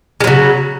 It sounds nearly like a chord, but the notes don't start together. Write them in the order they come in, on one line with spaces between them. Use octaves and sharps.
G#3 F#3 C#3